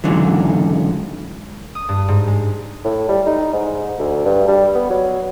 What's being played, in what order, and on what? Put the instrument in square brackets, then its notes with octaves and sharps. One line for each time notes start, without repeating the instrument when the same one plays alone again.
[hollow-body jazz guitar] C#2 G#2 D3 E3 F#3
[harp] D#6
G2
G#2
G#3
[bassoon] A2
G3
D#4
G#2
D2
G2
G3
B3
F#3